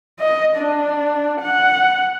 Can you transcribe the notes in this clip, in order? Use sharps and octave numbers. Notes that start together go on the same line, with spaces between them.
D#5
D4
F#5